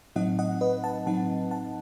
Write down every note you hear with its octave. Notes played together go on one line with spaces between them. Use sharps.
A2 F#3 C4 D#4 D#5 F#5
D#5 F#5
B4 D#5
F#5 A5
A2 F#3 C4 D#4 F#5 A5
F#5 A5